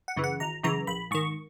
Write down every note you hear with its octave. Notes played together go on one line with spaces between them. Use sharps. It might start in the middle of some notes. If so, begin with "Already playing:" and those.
F#5
F#2 C#3 E3
F#5
G#1 A#5
F#2 C#3 E3 A#5
A#1 B5
G#2 D#3 C#6